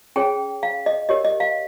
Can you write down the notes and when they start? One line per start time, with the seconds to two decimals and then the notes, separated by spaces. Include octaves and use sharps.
0.16 C#4 G#4 C#5 G5
0.63 F5
0.86 D#5
1.09 G4 A#4 C#5 D#5
1.25 D#5
1.40 F5